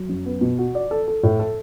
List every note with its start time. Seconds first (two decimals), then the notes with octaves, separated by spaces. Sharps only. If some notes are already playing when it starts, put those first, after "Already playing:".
Already playing: F#3
0.09 F#2
0.26 B3
0.41 B2
0.59 F#4
0.75 D5
0.91 A4
1.08 A4
1.23 A2
1.39 A4